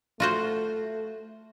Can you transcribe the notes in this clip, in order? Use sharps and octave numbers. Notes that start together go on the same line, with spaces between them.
A3 F4 F#4 C5